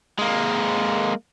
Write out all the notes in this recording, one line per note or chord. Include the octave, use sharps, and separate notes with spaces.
G#3 A#3